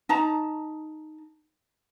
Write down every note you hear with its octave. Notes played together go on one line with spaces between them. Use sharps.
D#4 A5 A#5